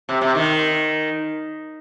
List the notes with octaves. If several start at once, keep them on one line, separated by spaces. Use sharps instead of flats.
C3
C3
D#3